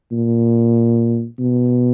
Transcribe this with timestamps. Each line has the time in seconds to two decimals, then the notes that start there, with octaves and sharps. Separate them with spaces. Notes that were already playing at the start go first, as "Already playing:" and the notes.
0.12 A#2
1.39 B2